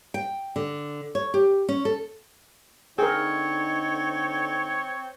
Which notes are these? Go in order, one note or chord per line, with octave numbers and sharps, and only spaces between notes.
G5
D3
C#5
G4
C#4
A4
D3 C4 D#4 G#4 A#4 C#5